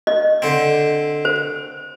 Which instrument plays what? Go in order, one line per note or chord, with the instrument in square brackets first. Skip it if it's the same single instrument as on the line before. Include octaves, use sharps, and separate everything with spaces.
[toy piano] D#5
[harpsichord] D3 C4
[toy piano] C5